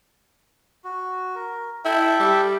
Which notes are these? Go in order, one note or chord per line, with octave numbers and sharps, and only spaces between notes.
F#4
A#4
E4 A4 E5 G5
G3